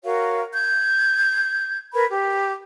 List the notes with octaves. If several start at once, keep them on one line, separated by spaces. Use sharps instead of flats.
F#4 A#4 C#5 F5
G6 G#6
A#4 B4 B5 G#6
G4